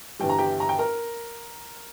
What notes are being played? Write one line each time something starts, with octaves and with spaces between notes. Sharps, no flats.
G1 G2 E3 G3 G5
A#5
G4 G5
A#5
G5
A#4 A#5